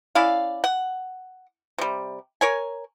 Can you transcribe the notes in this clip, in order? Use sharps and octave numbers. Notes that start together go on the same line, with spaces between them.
C#4 E4 D5 F5
F#5
C3 G3
A#4 C#5 G#5